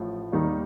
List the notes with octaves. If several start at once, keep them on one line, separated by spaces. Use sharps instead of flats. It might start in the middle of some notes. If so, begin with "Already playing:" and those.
Already playing: A1 A2 F3
D#2 D#3 G3 A#3 D#4